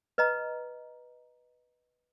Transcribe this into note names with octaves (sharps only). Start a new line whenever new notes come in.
B4 D#5 A#5